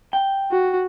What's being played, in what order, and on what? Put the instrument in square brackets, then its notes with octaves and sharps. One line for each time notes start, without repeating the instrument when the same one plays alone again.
[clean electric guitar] G5
[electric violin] F#4